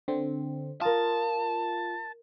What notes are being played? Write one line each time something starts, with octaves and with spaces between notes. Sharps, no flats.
D3 C4
F4 A#4 A5 D#6